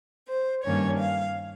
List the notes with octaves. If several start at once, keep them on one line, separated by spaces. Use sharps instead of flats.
C5
G2 D#3 A#3 C#4 C#5
F5